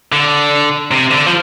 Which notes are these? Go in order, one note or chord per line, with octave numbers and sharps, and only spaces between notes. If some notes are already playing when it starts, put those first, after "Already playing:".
D3
C3
D3
F3